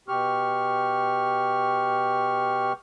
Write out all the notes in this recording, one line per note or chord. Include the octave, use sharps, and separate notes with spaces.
B2 G4 C#6 F6